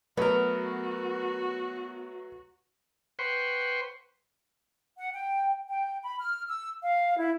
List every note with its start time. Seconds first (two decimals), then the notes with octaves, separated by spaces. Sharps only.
0.17 F#3 A3 B3 F#4 A#4 B4
3.19 B4 C5 F#5 G5 C6 C#6
4.98 F#5
5.14 G5
5.69 G5
6.03 B5
6.20 F6
6.48 E6
6.82 F5
7.17 E4